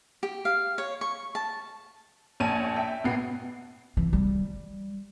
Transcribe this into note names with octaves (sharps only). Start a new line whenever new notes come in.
G4
F5
C#5
C#6
A5
A#1 C#5 G#5 A5 D#7
E5 G5
A1 B2 B3 C7
E3
G3